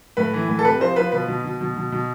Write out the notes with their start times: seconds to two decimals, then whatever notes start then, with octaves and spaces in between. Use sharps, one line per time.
0.17 A2 B4
0.34 E3
0.48 A2
0.59 A4
0.65 C3 B4
0.80 F3 C5
0.96 F3 B4
1.12 B2 B4
1.28 B2
1.44 B2
1.61 B2
1.76 B2
1.92 B2